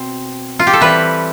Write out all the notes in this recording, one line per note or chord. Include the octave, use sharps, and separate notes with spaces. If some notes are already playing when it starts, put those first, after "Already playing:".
Already playing: B2 C4
F4
G4
A4
E3 G3 C4 B4